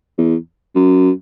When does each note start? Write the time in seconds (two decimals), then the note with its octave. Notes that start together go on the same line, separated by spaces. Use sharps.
0.18 E2
0.75 F#2